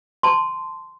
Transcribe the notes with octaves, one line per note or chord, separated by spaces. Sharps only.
A5 C6